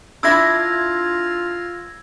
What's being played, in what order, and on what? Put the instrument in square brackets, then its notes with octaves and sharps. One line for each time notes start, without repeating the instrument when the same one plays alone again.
[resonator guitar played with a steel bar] D4 E4 E5 [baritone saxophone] F4 [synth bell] E6 G#6 A#6